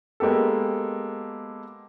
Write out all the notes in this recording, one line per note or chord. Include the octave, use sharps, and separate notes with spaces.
G#3 A#3 B3 G4 A4